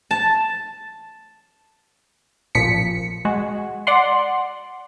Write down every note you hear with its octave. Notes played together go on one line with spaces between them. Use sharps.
A5
A1 A#2 F3 B6 C#7
G#3 F#4
D5 F#5 C6